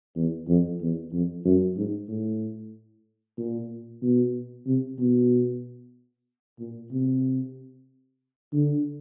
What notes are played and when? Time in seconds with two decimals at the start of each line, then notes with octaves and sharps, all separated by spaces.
0.16 E2
0.48 F2
0.81 E2
1.13 F2
1.45 F#2
1.77 G#2
2.09 A2
3.38 A#2
4.02 B2
4.66 C3
4.99 B2
6.59 A#2
6.92 C3
8.53 D3